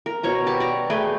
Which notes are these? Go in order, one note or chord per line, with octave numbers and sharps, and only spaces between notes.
A#4
B2 C#5 A#5
G4 A5 B5
D5 A#5
A3 G#4 B4 G5